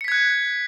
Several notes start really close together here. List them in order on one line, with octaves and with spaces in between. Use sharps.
C#7 B6 G#6 F#6